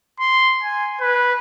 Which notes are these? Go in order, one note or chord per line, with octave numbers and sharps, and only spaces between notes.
C6
G#5
B4